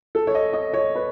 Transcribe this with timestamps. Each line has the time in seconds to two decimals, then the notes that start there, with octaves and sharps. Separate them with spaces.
0.15 A4
0.27 C#5
0.35 D#5
0.53 D#5
0.73 C#5
0.95 B4